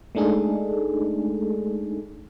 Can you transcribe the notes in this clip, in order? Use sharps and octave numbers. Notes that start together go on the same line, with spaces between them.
G#3 A3 D4 D#4 G#4 A4